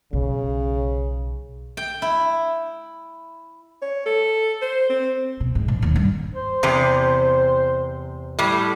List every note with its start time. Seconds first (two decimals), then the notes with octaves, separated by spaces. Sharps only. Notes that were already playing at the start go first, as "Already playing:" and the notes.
0.13 B1 C#3
1.77 G5
2.02 E4
3.82 C#5
4.06 A4
4.62 C5
4.89 C4
5.40 B2
5.55 G#2
5.68 A#1
5.82 D#2
5.96 G2
6.35 C5
6.63 E2 C3
8.39 A2 G3